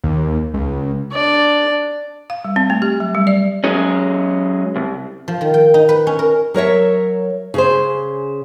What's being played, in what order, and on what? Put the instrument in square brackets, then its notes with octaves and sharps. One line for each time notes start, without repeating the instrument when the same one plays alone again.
[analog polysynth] D#2
C#2
[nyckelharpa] D4 D5
[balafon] F5
G3
C4
A3
G4
F#3
G3
D5
[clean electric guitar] F#3 G#3 C#4
C2
[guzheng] F3
D#3
G5
D#4
B4
C#4
A#4
[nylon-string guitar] F#3 A#4 C#5 E5
C#3 G#4 C5